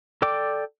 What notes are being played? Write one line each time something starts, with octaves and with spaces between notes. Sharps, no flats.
A4 D5 G5 D6